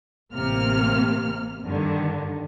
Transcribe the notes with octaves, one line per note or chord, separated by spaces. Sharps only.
A1 C3 A#3 F6
G2 D3 D#3